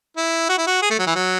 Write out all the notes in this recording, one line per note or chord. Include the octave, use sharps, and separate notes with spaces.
E4
F#4
E4
F#4
G#4
A3
F#3
E3
F#3